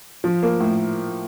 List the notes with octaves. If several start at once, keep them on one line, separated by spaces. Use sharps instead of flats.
F3
A#3
A2